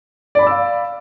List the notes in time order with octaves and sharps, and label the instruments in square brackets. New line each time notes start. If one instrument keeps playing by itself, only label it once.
[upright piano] D5
B5
D6
E6
F5